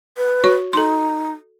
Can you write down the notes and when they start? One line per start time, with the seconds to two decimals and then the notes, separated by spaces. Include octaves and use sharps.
0.17 B4
0.44 F#4 C#5 C#6
0.73 D#4 A4 C6